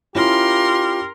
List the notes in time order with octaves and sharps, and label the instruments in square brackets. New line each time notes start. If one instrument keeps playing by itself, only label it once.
[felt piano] C#4 E4 [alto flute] F4 [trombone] G4 [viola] A#4 C6